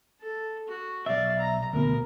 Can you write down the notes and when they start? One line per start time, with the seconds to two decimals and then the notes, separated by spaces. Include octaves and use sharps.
0.20 A4
0.67 F#4
1.06 B1 D5 E5 F5
1.38 A#5
1.73 D2 B2 A#4